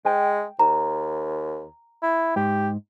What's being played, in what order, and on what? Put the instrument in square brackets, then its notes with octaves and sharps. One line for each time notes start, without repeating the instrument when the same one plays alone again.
[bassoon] G#3 [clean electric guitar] G5
[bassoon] D#2 [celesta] A#5
[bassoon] E4
[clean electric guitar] G#2 [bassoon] G4